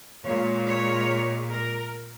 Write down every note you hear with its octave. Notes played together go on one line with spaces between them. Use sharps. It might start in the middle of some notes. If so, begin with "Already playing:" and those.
A#2 G#3 C#5
C#5
A#4